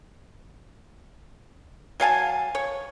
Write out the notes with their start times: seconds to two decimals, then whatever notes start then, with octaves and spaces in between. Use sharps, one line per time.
2.00 F#3 F5 G#5 A5
2.55 C#5